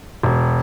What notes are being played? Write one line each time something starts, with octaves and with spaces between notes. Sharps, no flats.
E1